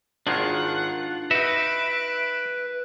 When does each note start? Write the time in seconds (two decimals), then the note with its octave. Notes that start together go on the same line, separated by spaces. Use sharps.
0.27 G#1 D#3 G#3 D4 F4 F#5
1.31 D#4 F#4 B4 E5 D7